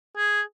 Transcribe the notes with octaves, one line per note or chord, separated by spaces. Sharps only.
G#4